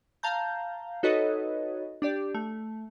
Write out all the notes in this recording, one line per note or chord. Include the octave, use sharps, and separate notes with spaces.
F5 A5 A#5 G6
D#4 F#4 A4 B4 C#5 D#5
D4 G4 D5
A3